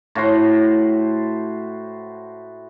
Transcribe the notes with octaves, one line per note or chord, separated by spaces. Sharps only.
A2 F#4 C5